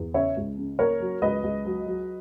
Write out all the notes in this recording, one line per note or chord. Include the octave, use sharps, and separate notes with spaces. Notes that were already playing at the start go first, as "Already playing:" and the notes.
Already playing: E2
C#3 C#5 E5
C#2
C#3
A#3 A#4 C#5
F#3
C#2 B4 D#5
C#2
F#3
F#3